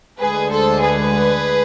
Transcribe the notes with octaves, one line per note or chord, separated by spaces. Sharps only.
D2 D3 G#3 G#4 B4
A4 C5
G#4 B4